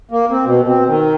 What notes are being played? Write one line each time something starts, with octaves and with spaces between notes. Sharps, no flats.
A#3
C4
B2
C4
D#3